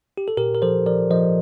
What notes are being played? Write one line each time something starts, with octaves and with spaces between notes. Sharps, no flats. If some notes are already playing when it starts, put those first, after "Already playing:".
G4
A4
A#2 G4 A#4
A#4
F3 A4 C5
F3 A#4 D5
F3 C5 D#5